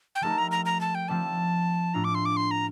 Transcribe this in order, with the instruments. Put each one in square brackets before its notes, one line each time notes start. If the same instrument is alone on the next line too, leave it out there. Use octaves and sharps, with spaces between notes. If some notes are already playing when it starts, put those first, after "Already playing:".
[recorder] G5
[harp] F3 A3 D#4 G4 A#4 [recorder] A5
[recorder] A#5
A#5
A#5
A5
G5
[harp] F3 A3 C4 G4 D5 [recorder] A5
[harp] A2 A3 D4 F4 [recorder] A#5
[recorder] D6
C6
D6
C6
A#5